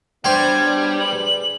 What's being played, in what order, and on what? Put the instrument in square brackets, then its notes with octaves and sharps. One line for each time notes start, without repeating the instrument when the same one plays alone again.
[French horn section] F#3 B3 D4 [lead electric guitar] G3 [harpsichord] C5 G5 [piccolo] G#6
[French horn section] G#4 B4 D5 [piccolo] F#7